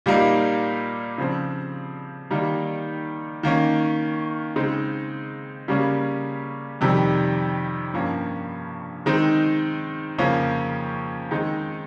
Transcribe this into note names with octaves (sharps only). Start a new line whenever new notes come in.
A#2 G3 A#3 D#4
C#3 F3 C4
D#3 G3 A#3 D#4
D#3 A#3 C#4
C#3 G#3 C4 D#4
C#3 G3 A#3 C#4
F2 C3 D#3 G3
G2 F3 A#3 C#4
D#3 G#3 C4 D#4
F2 C#3 F3 A#3 C#4
D#3 G#3 C4 D#4